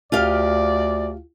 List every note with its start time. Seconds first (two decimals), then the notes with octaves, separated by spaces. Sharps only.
0.12 D2 F4 G4 D5 F5